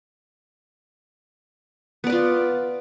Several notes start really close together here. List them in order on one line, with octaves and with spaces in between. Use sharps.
B3 D5 B4 F4